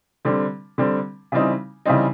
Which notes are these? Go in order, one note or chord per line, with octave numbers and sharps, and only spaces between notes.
D3 G3 C4
D3 G3 C4
C#3 E3 G3 C4 D#4
C#3 E3 G3 C4 D#4